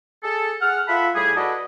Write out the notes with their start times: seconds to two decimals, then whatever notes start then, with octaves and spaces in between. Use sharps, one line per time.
0.23 G#4 A4
0.62 G#4 F#5 F6
0.88 F4 A4 E5 F#5 B5
1.15 A2 G3 G#4
1.36 F#4 A4 B4 D5 D#5